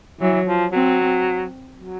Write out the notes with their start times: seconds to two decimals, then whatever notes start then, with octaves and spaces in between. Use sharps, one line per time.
0.21 E3 F#3
0.47 F3
0.72 F#3 C4
1.77 F#3